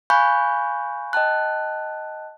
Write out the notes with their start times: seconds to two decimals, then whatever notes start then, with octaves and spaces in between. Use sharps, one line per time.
0.10 F5 G#5 B5 C#6 F#6 G6
1.13 D#5 G5 A5 F#6